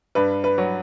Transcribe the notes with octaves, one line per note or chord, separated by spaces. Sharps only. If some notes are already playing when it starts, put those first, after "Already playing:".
G2 B4
B4
F#3